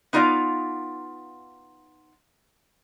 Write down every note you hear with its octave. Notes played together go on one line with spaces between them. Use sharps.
B3 D#4 F4 D5 F5